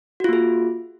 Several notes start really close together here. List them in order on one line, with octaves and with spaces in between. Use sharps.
F#4 F4 A#3 G#4